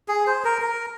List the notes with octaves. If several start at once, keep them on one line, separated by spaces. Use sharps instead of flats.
G#4
C5
A#4
A#4